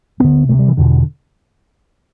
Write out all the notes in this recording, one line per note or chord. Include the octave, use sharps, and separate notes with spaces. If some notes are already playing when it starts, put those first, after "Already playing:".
D2 D3 B3
D2 C3 A3
G3
E3
E2 B2 D3